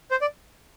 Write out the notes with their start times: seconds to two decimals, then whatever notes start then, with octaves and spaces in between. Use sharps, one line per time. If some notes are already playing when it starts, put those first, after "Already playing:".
0.11 C5
0.21 D5